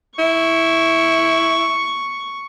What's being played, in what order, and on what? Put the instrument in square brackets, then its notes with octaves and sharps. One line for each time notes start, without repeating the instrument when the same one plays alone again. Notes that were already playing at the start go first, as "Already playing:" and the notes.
[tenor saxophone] E4 [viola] C#6